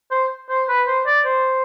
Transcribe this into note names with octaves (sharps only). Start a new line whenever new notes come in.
C5
C5
B4
C5
D5
C5